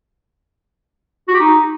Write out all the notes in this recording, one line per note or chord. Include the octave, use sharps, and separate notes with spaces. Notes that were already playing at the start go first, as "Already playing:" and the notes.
F#4
G4
D#4